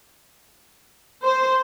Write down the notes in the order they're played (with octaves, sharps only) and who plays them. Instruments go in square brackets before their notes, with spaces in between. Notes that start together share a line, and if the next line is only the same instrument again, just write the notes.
[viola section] C5